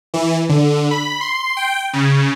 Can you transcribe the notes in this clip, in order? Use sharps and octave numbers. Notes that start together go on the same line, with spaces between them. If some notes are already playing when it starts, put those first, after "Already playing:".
E3
D3
B5
C6
G5
C#3